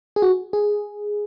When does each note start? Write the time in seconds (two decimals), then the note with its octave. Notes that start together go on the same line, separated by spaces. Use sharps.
0.16 G#4
0.22 F#4
0.53 G#4